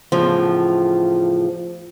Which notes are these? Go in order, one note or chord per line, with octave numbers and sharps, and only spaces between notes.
E2 A2 C#3 F3